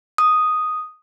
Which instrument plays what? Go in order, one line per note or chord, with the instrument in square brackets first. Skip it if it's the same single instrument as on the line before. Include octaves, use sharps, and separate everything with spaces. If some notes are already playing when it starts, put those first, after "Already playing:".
[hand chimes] D#6